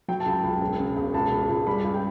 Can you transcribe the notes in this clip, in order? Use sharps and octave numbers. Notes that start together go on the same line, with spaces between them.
F#3 G5
A5
C#2
G5
C#2
E1
C#3
E1
C#2 A5
C#2
C#2
G3 B5
C#2
G5